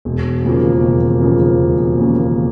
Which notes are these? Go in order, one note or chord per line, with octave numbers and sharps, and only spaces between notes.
E1
D#2 C#3 F3 A#3
E1
D#2 C#3 F3 A#3
E1
D#2 C#3 F3 A#3